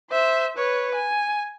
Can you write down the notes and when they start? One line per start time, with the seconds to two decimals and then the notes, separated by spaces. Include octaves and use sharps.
0.11 C5 E5
0.57 B4 C#5
0.95 G#5